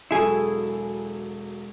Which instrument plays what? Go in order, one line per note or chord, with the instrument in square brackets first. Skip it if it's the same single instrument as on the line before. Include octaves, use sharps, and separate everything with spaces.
[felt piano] E1 F#3 A4 [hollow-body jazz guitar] E4 G#4